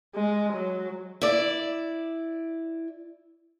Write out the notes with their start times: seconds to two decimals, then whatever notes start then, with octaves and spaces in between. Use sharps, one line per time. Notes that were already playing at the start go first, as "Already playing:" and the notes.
0.15 G#3
0.53 F#3
1.21 E4 D5